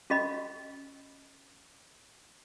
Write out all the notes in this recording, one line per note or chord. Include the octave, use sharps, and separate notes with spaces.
C#4 F#4 D#5 B5